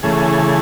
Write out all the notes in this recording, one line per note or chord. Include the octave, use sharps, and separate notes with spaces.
C#3 E3 A3 G#4